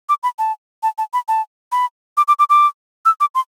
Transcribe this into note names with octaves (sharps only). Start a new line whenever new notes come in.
D6
B5
A5
A5
A5
B5
A5
B5
D6
D6
D6
D6
E6
D6
C6